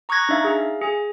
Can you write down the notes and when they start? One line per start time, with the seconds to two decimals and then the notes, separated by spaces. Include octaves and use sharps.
0.09 A#5 C#6 D#6 F#6 G#6 A#6
0.29 D4 D#4 E5 F5
0.44 G#4 F5
0.81 G#4 G#5